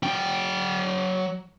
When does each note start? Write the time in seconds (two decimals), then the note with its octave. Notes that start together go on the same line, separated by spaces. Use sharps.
0.03 F#3 G5